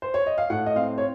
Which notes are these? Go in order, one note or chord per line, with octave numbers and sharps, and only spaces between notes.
C5
C#5
D#5
F5
A2 F#5
D#5
C4 F5
C#5